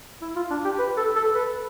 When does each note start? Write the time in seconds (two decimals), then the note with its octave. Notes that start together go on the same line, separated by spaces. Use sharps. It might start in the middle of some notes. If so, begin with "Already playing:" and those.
0.22 E4
0.36 F4
0.50 D4
0.65 G4
0.79 B4
0.97 A4
1.16 A4
1.35 B4